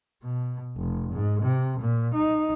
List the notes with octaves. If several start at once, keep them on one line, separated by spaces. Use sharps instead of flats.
B2
F1
G#2
C3
A#2
D#4